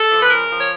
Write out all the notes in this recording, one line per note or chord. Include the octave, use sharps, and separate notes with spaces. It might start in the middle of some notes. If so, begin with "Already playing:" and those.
Already playing: A4
F3
B4
C#3 A#4
F3
C#5